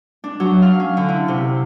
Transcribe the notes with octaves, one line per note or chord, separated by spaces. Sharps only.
D4
F#3
F5
C#4
D3
E4
C3